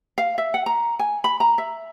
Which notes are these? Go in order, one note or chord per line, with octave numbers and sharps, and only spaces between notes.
F5
E5
F#5
A#5
G#5
B5
A#5
E5